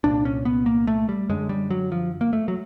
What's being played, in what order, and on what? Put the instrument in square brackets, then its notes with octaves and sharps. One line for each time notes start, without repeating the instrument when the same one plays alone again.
[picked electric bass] C2 A#2 D4
C#4
B3
A#3
A3
G3
F#2 D3 G#3
G3
F#3
F3
A#3
A3
F#3